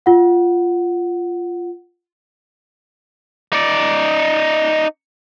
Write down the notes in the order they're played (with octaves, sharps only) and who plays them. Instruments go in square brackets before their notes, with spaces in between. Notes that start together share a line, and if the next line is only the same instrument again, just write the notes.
[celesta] F4 F#5
[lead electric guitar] D#4 D5